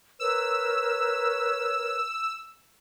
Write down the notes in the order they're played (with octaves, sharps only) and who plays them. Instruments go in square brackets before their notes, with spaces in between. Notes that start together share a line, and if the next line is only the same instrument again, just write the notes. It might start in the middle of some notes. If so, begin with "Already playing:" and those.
[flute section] A#4 B4 C#5 [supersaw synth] E6